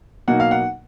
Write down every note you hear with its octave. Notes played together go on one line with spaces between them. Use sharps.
B2 F#3 A#3 D#4 F#5
F5
F#5